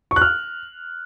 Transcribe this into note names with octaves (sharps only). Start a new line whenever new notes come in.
C#6
F#6
F6